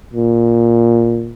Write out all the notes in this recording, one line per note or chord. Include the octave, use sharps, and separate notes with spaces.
A#2